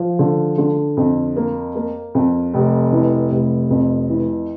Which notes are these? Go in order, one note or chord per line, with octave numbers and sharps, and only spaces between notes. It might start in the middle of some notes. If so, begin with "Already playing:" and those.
Already playing: F3
D3
D3
F2
A#3
A#3
F2
F1
E3
F1
F2
E3